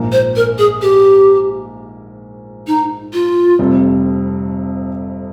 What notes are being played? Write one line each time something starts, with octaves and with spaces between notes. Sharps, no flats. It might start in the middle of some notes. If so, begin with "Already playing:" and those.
Already playing: A#1 G#2 F3 A#3
C5
A#4
G#4
G4
D#4
F4
F1 F2 C3 G3